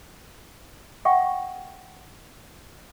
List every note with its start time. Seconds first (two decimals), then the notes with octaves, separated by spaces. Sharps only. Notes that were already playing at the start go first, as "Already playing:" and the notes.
1.05 E5 F#5 G5 C#6